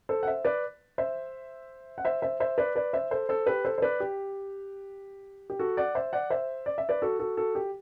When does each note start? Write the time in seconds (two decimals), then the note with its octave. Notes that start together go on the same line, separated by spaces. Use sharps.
0.09 A4 C5
0.23 F#5
0.27 C5 E5
0.45 B4 D5
0.98 C5 E5
1.98 F#5
2.05 C5 E5
2.22 C5 E5
2.40 C5 E5
2.58 B4 D5
2.76 B4 D5
2.93 C5 E5
3.11 A4 C5
3.29 A4 C5
3.46 G4 B4
3.65 A4 C5
3.78 C5
3.82 B4 D5
4.00 G4
5.50 G4
5.59 F#4 A4
5.77 D5 F#5
5.95 C5 E5
6.13 D5 F#5
6.30 C5 E5
6.66 D5
6.78 E5
6.89 B4 D5
7.02 F#4 A4
7.19 F#4 A4
7.37 F#4 A4
7.55 G4